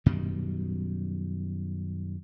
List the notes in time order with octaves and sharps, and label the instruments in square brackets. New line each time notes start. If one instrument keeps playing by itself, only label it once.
[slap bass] F#2 B2 D#3 G3